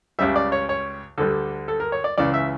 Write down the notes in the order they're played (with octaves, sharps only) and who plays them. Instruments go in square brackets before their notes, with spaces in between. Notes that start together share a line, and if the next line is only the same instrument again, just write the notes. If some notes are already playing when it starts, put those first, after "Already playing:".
[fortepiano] C#2 C#3 G3 E5
D5
C#5
C#5
D2 D3 G3 A4
A4
A#4
C#5
D5
C#2 C#3 E3 D5
E5